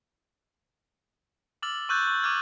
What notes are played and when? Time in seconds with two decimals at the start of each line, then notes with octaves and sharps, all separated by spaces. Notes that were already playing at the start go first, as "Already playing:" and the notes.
1.62 D6 E6 F6 A6 F#7
1.89 C#6 E6 F#6 G6 A6
2.07 C#6
2.23 C#6 D6 F6 G#6